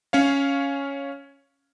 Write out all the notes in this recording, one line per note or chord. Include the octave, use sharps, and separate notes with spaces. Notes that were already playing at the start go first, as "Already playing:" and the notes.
C#4 C#5 F5